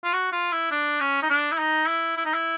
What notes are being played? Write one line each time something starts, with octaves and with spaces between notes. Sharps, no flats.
F4
F#4
F4
E4
D4
C#4
D#4
D4
E4
D#4
E4
E4
D#4
E4